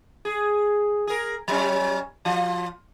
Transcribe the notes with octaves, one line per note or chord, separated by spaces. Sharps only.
G#4
G#4 A#4
F#3 G3 C#4
F3 F4